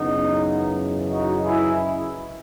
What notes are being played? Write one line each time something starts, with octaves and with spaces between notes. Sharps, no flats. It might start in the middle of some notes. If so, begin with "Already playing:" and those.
Already playing: F#2 C#3 E3 B3 D#4
D#4 F#4
E4 G#4